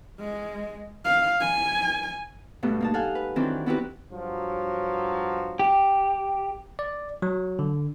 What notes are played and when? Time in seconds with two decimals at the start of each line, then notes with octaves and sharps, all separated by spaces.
0.19 G#3
1.05 F5
1.40 G#5
2.63 G2 B2 A3 B3
2.80 A#3 D#4 A5
2.94 A4 F5 F#5 G#5
3.15 B4
3.36 D#3 E3 F#3 C4 D4
3.66 B3 C4 E4 F#4 G4 B4
4.12 G2 F3 F#3
5.59 G4
6.79 D5
7.22 F#3
7.59 D3